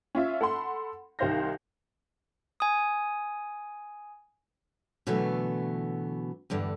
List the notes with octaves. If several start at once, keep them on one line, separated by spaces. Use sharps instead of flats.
C#4 F4 E5
A4 F#5 B5 C6
C2 D#3 C5 F5 G6 A#6
G#5 D#6
B2 D3 E3 F#3 A3 B3
E2 G2 D3